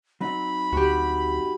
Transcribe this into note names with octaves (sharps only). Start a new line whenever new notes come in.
F#3 C4 D#4 B5
D2 F#4 G4